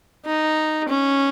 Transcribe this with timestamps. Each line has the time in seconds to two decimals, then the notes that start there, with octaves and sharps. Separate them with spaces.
0.25 D#4
0.89 C#4